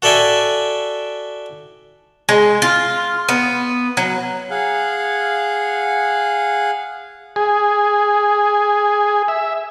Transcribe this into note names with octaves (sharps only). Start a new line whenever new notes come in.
F#4 A4 D5 E5 G5 G#5
G#3
F4
B3
F#3
G#4 F5 F#5
G#4
E5